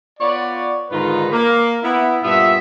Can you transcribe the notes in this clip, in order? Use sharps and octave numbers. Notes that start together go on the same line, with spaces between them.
B3 F4 C#5 D5
G#2 D3 D#3 F4 B4 A#5
A#3
B3 E4
G2 A#2 B3 F4 E5